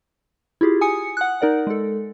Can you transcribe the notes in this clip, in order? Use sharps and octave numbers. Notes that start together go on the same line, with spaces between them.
E4 F4 G4 G#4
G#5 D#6 C#7
F#5 F#6
D#4 A#4 D5 F#5
G#3 A4